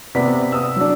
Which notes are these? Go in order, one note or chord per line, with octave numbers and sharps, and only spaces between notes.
C3 B3 D5 B6
D#6 E6
F#3 D4